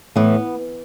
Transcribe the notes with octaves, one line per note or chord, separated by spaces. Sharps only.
A2 E3 B3